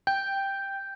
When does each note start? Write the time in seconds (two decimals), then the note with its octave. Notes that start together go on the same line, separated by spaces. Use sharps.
0.07 G5 G6